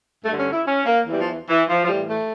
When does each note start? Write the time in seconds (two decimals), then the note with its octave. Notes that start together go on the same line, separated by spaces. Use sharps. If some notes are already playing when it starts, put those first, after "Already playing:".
0.24 G2 D3 A3
0.38 C#4
0.52 E4
0.66 C#4
0.86 A#3
1.06 E2 E3 G3
1.20 F3
1.48 E3
1.68 F3
1.84 F3
1.88 A2 E3 G3
2.09 A3